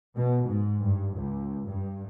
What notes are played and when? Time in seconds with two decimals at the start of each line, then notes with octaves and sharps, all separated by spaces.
0.16 B2
0.45 G#2
0.82 G2
1.16 C#2
1.68 G2